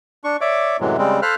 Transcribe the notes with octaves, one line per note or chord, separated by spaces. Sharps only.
D4 C#6
C#5 D5 E5 D6
F#2 A2 C3 E3 F#3 G#3
C#3 G3 G#3 C4
A4 C5 F5 B5 F6 F#6